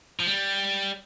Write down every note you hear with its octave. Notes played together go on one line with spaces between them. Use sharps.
F3
G3